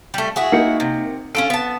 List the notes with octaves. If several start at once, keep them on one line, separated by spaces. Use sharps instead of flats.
G3 A3
E4 F#4 G#4
A#3 D#4 C#7
C3
C#4 F4 A4 D7
B3 A5